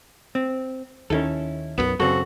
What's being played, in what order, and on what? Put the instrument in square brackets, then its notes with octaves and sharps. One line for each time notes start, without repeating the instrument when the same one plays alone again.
[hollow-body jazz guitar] C4
[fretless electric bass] D#2 D#3 [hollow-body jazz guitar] C#4 E4 A4
[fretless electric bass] B1 F#2 [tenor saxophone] B3
[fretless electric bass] F#2 C#3 [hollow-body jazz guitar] C4 A4 [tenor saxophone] F#4